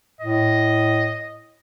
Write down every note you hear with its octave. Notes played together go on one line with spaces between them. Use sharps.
A2 D#5